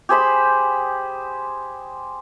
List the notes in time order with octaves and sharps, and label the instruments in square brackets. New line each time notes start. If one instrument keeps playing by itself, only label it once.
[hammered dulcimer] G4 G#4 C5 B5